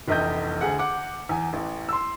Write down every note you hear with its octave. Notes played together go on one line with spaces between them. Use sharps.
F1 A#1 E2 D#5 G5 G6
D2 G#4 F#5
F#5 D6
E2 G#5
A1
C6 E6